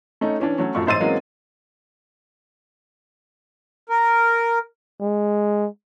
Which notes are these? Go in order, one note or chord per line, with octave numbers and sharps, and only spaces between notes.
A3 C#4 D#4
E3 C#4 D4
F#3 A3 C#4
F#2 F3 A3 C#6
A1 G#2 C5 E6 A6 D#7
E3 F#3 G#3 A#3 C4 C#4
A#4
G#3